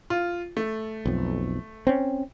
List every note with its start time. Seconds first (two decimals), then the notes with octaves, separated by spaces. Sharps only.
0.10 F4
0.57 A3
1.06 B1 F2
1.87 C4 C#4